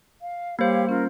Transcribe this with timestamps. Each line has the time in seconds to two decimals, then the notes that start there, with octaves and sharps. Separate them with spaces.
0.22 F5
0.59 G3 A#3 G4 C5 C#5 F5
0.89 C#4 F4 A#4